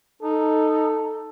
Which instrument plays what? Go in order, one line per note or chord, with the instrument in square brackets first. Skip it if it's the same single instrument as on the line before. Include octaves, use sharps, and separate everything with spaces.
[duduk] D#4 [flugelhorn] A4